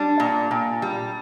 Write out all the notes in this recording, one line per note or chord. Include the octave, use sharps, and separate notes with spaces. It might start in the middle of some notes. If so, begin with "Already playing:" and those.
Already playing: G3 D4
A#2
A#2
G3